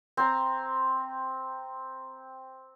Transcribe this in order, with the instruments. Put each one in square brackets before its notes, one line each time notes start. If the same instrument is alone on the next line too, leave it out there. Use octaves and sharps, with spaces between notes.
[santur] C4 A#5